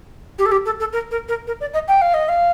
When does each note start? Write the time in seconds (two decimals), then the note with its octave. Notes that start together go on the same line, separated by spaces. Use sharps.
0.39 G4
0.46 A4
0.52 G4
0.66 A4
0.80 A4
0.93 A#4
1.11 A#4
1.28 A#4
1.47 A#4
1.61 D5
1.74 D#5
1.88 G5
2.02 F5
2.14 D#5
2.29 F5